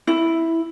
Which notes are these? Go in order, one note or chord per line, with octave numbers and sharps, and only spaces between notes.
E4